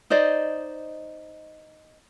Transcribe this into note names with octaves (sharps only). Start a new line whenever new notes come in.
D#4 C5 D5 D#5